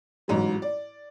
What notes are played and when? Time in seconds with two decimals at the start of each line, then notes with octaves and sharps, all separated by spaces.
0.28 A1 G#2 F#3
0.62 D5